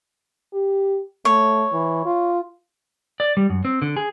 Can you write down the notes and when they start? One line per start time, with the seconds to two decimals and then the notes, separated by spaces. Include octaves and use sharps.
0.53 G4
1.25 A3 C#5
1.72 E3
2.05 F4
3.20 D5
3.37 G3
3.50 F#2
3.65 C4
3.82 D3
3.97 G#4